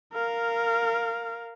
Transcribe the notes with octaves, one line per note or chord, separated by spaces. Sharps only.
A#4 F5